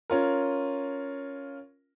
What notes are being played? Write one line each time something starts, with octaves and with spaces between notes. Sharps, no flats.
C#4 F4 A#4